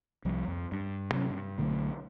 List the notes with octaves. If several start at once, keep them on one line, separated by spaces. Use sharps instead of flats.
C2 F3 G3
F2
G2
C3 F#3 G#3 C#4
G2
B1 D3 F#3 A3